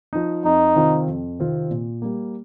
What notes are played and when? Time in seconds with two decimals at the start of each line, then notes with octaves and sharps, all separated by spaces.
0.13 F3 D#4
0.44 F2 D#4
0.76 C3 D#3 C4 F4
1.07 F2
1.39 C3 D#3 C4 F4
1.71 A#2
2.02 G3 A#3